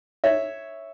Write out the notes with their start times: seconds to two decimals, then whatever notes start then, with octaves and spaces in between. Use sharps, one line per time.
0.24 C#5 E5